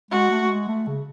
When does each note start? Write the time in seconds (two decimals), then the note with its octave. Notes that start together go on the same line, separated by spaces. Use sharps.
0.11 G#3 F#4
0.30 A3
0.49 G#3
0.68 A3
0.87 C#3